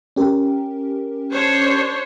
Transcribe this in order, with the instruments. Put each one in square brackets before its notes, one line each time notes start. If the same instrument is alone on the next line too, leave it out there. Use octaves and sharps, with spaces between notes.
[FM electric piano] C#4 G4 A#4
[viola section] D4 C5 C#5